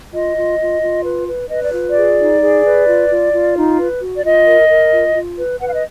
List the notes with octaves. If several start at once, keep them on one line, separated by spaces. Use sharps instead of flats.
F4 D#5
F4
F4
F4
B4
B4
B4 D#5
D5
F4
D5
G#4
D#4
G#4
B4
F4
F4
F4
D#4
B4
F#4
D5
F4 D#5
A#4
A#4
F4
F4
B4
B4 F#5
F5
D#5